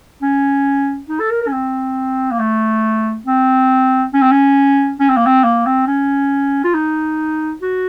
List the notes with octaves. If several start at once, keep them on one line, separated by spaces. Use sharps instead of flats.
C#4
D#4
A4
A#4
A#4
C#4
C4
A#3
A3
C4
C#4
C4
C#4
C#4
C4
A#3
C4
A#3
C4
C#4
F4
D#4
F#4